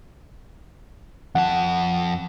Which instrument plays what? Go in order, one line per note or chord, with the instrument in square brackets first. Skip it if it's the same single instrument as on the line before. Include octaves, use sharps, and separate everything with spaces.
[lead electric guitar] F2 A5 [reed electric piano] F#5